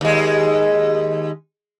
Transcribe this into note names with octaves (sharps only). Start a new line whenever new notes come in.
D#2 G#3